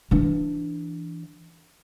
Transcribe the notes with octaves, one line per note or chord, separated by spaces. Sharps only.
E3 D4